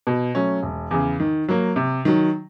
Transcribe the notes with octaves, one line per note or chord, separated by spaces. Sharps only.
B2
F#3 A3 C#4
E1
E2 C#3
D#3
F#3 A#3
C3
D#3 F#3